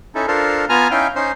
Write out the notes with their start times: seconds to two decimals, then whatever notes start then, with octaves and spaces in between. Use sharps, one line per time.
0.15 C#4 D#4 E4 A4
0.28 D4 F4 A4 A#4 C5
0.69 B3 F4 G#5 A#5 F6
0.91 C#4 D#4 E4 F5 G5
1.15 C#4 D#4 C5